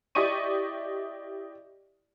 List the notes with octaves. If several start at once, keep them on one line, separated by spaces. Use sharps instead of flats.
E4 G4 D5 D#5 C#6 D#7